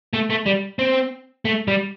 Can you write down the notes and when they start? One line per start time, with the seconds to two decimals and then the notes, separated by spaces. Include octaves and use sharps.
0.13 A3
0.30 A3
0.46 G3
0.79 C4
1.45 A3
1.68 G3